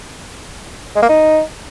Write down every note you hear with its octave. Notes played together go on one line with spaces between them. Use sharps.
G#3
A#3
D#4